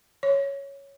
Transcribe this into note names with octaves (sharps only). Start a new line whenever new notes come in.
C#5